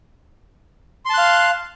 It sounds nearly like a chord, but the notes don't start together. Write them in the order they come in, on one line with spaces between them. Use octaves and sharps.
C6 A5 F#6 F5